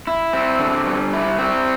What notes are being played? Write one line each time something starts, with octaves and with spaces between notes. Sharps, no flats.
E4
C4
D3
G3
E4
C4